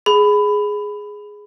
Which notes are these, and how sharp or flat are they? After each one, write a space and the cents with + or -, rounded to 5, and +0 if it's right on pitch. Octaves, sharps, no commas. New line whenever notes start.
G#4 +0 B5 +15